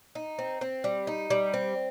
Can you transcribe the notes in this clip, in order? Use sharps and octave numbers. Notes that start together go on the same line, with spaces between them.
D#4
C4
C4
G3
D#4
G3
C4